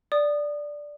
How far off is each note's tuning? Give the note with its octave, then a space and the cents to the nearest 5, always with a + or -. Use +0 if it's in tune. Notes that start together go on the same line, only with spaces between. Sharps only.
D5 +0 D#6 -25